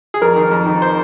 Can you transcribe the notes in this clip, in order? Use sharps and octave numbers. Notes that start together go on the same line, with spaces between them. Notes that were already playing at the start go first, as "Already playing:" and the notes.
G#4
F2 A#4
D#3
F2
D#3
C5